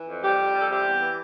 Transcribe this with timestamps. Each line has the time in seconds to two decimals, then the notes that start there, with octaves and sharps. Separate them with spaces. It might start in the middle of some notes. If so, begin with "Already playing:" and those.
Already playing: E3
0.08 F2
0.24 G3 G4
0.39 F2
0.54 G3
0.60 A4
0.70 C3 G4
0.85 E2
1.00 E3